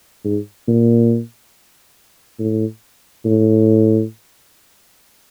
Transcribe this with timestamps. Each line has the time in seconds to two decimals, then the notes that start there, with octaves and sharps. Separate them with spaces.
0.25 G#2
0.68 A#2
2.39 A2
3.25 A2